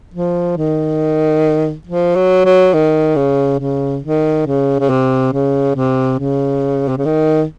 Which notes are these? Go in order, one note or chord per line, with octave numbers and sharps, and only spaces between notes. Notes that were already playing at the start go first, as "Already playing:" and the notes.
F3
D#3
F3
F#3
F#3
D#3
C#3
C#3
D#3
C#3
C#3
C3
C#3
C3
C#3
C3
C#3
D#3